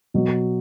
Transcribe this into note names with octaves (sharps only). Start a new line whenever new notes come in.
B2 F#3